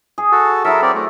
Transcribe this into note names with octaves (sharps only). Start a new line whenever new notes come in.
G#4
F#4 A4
F#3 E4 A4 A#4 E5
C4 A#4 D5
A3